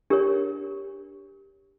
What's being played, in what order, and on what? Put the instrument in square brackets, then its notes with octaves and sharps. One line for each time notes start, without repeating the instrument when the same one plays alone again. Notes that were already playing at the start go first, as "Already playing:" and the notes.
[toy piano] D4 G4 A#4 C#5